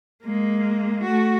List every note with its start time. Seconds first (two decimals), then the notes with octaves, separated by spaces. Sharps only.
0.23 G#3 A#3
1.04 A3 F#4